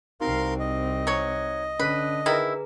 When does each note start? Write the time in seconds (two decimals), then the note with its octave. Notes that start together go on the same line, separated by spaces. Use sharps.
0.21 C2 C4 D#4 F#4 A#4 F5 C6
0.60 D#5
1.07 F#3 C#5
1.79 D3 C#4 B4
2.26 D#3 E4 G#4 B4 A#5